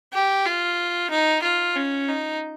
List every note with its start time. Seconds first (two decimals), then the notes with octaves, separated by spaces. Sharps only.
0.13 G4
0.45 F4
1.10 D#4
1.43 F4
1.76 C#4
2.08 D#4